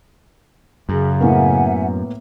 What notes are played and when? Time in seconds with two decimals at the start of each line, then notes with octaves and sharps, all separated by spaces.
0.89 F#2 C#3 G#4
1.21 A2 A#3 B3 E5 F#5 G#5